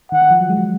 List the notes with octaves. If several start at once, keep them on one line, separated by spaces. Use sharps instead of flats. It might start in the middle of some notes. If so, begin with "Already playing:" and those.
D#3 F#5
D#3
F3
F#3
G#3
F#3